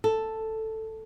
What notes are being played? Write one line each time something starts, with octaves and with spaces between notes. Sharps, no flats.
A4